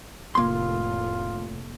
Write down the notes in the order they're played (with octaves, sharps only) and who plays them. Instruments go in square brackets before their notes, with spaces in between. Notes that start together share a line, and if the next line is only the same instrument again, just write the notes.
[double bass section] F1 A2 [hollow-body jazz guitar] A#3 C6 [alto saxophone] F4